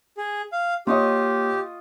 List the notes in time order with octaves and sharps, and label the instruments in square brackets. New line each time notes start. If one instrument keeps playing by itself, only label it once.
[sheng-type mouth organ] G#4
F5
[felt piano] A#3 C#5 [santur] F4 D#5 C#6 [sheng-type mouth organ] G4